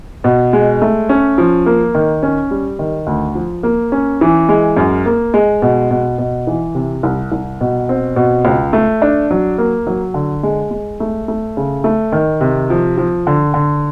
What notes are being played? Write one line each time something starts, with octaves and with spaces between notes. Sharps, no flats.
B2
G#3
A3
C#4
F3
A#3
D#3
C#4
G3
D#3
D2
F3
A#3
C#4
E3
G#3
F#2
A#3
G#3
B2
B2
B2
E3
C3
C2
C2
B2
C4
B2
C#2
A3
D4
F#3
A#3
F#3
D3
G#3
G#3
A3
A3
C#3
A3
D#3
C3
F3
F3
D3
D3